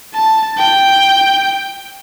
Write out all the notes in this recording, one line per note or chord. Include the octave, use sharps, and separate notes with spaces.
A5
G5